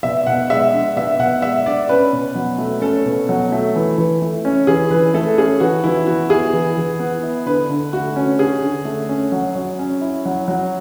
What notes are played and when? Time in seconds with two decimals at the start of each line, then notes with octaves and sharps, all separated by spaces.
0.03 B2 E5
0.26 B2 F#5
0.50 G#3 E5
0.73 D4
0.96 B2 E5
1.19 B2 F#5
1.42 G#3 E5
1.66 D4 D5
1.89 C#4 B4
2.13 B2
2.35 F#3
2.58 A3
2.82 C#4 A4
3.06 B2
3.29 F#3
3.52 A3
3.76 E3
3.98 E3
4.22 A3
4.45 C#4
4.67 E3 G#4
4.91 E3 B4
5.14 A3 A4
5.38 C#4 G#4
5.60 E3 F#4
5.84 E3 E4
6.07 B3 F#4
6.30 E4 G#4
6.53 E3
6.77 E3
6.99 B3
7.23 E4
7.46 D3 B4
7.70 D3
7.93 A3 F#4
8.16 C#4
8.39 D3 G#4
8.62 D3
8.85 A3
9.09 C#4
9.32 F#3
9.55 F#3
9.79 C#4
10.01 E4
10.25 F#3
10.48 F#3